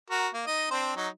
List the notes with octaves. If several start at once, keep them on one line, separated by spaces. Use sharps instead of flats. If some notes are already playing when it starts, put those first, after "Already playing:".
F#4 A#4
A#3
D#4 D#5
C4 D4 C5
F#3 D#4